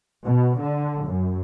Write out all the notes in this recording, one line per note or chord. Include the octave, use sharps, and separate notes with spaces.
B2
D3
F#2